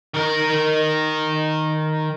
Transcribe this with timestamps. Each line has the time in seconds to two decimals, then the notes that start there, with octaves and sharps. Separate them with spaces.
0.14 D#3 A#4